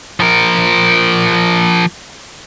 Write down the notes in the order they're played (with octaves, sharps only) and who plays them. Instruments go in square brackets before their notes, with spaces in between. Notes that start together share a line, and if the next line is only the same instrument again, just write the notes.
[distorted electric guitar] F3 A#4